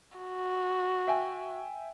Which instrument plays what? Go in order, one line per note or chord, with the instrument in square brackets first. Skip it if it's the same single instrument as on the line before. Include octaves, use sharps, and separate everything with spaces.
[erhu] F#4
[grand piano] E5 G5 G#5